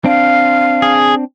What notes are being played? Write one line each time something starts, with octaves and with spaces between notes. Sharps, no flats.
C4 D4 F5
G#4